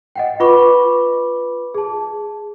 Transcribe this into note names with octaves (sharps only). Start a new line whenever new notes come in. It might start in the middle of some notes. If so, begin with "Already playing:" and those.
D#5 F#5 G5
F4 B4 B5 C#6 D6
G#4 A5